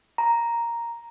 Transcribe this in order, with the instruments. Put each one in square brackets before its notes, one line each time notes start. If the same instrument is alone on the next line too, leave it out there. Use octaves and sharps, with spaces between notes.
[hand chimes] A#5